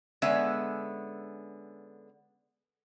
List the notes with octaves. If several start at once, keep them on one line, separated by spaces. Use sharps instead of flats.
D3 G#3 B3 C#4 E5 G#5